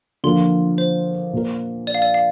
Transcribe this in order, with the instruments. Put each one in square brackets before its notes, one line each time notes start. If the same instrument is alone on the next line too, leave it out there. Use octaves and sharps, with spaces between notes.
[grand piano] D3 F3 A#3 F4 [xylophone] C6
[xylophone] C5
[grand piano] A#2 A#3 F4 A#4
[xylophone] D5
F5
D5
F5